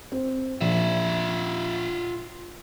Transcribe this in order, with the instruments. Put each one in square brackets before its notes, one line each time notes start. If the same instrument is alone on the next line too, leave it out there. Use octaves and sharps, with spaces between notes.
[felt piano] C4
[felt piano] A#1 [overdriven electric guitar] F4 E5